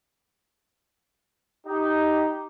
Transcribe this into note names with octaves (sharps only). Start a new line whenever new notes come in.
D#4 G4